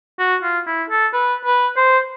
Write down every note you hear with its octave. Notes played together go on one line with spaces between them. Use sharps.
F#4
F4
E4
A4
B4
B4
C5